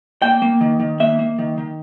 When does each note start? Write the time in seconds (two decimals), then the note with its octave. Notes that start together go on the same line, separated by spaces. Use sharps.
0.22 A#3 G5
0.42 A#3
0.61 D#3
0.80 D#3
1.00 A#3 E5
1.19 A#3
1.39 D#3
1.58 D#3